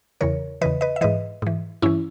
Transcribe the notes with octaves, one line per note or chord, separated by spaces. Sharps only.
E2 C#3 E3 A#4 C#5
E2 C#3 E3 B4 D#5
B4 D#5
E5
G#2 E3 B4 D#5
G#2 E3
G2 E3 C#4 E4